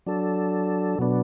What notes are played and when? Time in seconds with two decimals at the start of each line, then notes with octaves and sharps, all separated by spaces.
0.06 F#3 D4 A4
0.98 B2 F#3 B3 D4